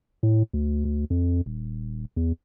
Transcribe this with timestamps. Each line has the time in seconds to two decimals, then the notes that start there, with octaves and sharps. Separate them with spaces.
0.23 A2
0.53 D2
0.85 D2
1.10 F2
1.46 D#1
2.16 E2